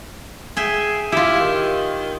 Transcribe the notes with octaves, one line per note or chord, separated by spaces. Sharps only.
G#4 E5 G5 G#5
E4 F4 G4
D#3